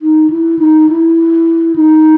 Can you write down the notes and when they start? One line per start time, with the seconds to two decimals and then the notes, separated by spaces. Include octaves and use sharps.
0.02 D#4
0.30 E4
0.59 D#4
0.89 E4
1.76 D#4